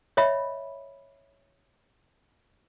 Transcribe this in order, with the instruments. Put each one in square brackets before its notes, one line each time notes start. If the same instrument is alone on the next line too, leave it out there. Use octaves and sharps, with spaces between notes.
[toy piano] C#5 D#5 E5 B5